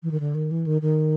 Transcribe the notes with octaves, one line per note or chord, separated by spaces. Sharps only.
E3
D#3
D3
D#3
E3
D#3
D#3